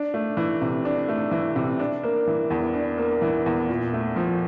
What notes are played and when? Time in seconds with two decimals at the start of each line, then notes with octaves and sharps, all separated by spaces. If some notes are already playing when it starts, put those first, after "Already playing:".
Already playing: D4
0.14 A3
0.37 E3
0.61 C3
0.85 D4
1.08 A3
1.31 E3
1.56 C3
1.80 D4
2.03 A#3
2.27 E3
2.50 E2
2.74 D4
2.98 A#3
3.22 E3
3.46 E2
3.69 A#2
3.93 A3
4.16 F3